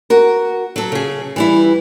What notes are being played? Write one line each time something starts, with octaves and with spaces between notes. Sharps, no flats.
F#4 A#4
F#3 A4
C#3 G#4
E3 G3 E4